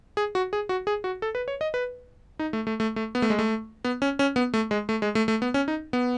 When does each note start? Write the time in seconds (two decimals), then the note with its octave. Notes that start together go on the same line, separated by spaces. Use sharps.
0.17 G#4
0.35 F#4
0.53 G#4
0.69 F#4
0.87 G#4
1.04 F#4
1.22 A4
1.35 B4
1.48 C#5
1.61 D#5
1.74 B4
2.39 D#4
2.53 A3
2.67 A3
2.80 A3
2.96 A3
3.15 B3
3.22 A3
3.30 G#3
3.39 A3
3.84 B3
4.02 C#4
4.19 C#4
4.36 B3
4.54 A3
4.71 G#3
4.89 A3
5.02 G#3
5.15 A3
5.28 A3
5.42 B3
5.54 C#4
5.68 D#4
5.93 B3